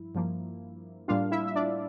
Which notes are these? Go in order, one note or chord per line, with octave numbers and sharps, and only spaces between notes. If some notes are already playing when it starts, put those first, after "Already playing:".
Already playing: G2 F3 E4
G2 F3 A#3
A2 G3 A#3 D4 F4 F5
E4 E5
E5
D4 D5